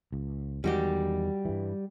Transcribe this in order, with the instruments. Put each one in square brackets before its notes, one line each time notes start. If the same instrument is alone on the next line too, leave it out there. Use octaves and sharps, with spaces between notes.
[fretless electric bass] C#2
[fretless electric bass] E2 D#3 G#3 [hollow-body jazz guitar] G3 F#4 G4
[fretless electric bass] G2 E3